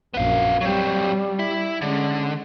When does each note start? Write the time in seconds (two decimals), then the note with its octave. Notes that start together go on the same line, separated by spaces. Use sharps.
0.14 A#1 F#2 B3 F5
0.61 F#3 G3 C4
1.39 E4
1.82 D3 G#3 C#4